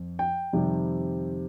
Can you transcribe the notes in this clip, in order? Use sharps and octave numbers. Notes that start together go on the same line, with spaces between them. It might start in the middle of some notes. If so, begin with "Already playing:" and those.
Already playing: F2
G5
F2 C3 D#3 G3 C4